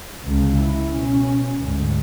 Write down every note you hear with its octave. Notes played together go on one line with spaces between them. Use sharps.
C#2 C#3
E4
B2 C#4
D2 G#2